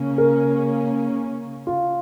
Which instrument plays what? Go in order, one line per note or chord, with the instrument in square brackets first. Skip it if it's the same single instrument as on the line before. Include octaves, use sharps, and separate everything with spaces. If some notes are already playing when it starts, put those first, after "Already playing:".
Already playing: [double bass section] C#3 A#3 C#4
[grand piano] A#4
F4